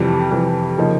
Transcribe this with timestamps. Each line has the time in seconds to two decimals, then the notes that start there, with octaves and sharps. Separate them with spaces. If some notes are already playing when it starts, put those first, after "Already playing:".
Already playing: F2 C3 E3 G3
0.31 F2 C3 E3 G3
0.78 C#3 F3 A#3 D#4